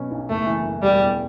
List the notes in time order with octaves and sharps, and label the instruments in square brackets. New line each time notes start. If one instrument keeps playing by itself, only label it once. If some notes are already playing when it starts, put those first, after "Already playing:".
Already playing: [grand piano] B2 F#3 C#4
B1
[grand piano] F#1 [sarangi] A3
[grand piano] E3
F#2
[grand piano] E1 [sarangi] G3
[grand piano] E2